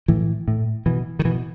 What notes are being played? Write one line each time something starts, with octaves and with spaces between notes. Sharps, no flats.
A2 E3
A2
B2 E3
D#3
B2 E3